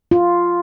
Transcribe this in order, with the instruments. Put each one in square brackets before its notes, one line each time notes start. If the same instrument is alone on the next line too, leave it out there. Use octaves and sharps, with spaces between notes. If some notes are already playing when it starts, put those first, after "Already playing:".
[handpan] F4